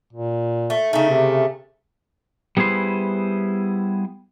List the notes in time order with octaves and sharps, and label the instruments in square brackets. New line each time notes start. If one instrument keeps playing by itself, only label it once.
[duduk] A#2
[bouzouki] A3
[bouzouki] C#3 A3 [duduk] D#4
[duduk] C3
[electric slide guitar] G3 B3 E4 G#4 C5